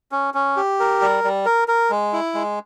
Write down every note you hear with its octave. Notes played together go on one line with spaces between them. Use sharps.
C#4
C#4
G4
A#4
G3
G3
A#4
A#4
G#3
E4
G#3